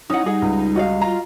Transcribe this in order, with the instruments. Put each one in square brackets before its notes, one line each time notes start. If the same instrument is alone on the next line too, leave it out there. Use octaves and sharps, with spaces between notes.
[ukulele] C#4 F#5 [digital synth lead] D#4 [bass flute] E4 [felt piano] D#6
[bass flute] G3 [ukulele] G#4 F#5
[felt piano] C#2
[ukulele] F#4 D#5 F5
[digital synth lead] F4 [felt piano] A#5